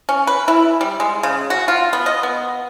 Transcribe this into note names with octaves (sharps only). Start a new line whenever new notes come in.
C#4
B4
E4
G3
G#3
C#3
F#4
F4
B3
D#5
B3